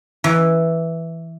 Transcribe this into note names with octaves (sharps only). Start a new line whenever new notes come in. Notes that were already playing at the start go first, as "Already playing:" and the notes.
E3